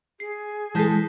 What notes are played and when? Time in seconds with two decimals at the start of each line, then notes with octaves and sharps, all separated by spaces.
0.20 G#4 C7
0.75 E3 G#3 A4 A5 G6 B6